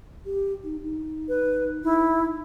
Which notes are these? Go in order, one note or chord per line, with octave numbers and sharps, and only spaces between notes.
G4
D#4
D#4
B4
D#4 E4